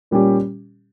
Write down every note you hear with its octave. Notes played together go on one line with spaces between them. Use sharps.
A#2 G3 C#4 G4